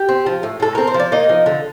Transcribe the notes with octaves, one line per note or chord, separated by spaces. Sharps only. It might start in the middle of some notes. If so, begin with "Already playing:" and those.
Already playing: G4 G5
C4
F3
A2
A2 A4
C4 A#4
C5
F3
D5
A#3 D#4 D#5
F3
D3